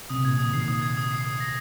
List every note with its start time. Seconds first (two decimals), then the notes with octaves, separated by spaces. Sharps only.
0.10 C3 D#6
0.25 A#2 G#6
0.39 C3 D#6
0.53 A#2 D#3 C7
0.68 D#6
0.82 G#6
0.97 D#6
1.11 C7
1.25 D#6
1.40 A#6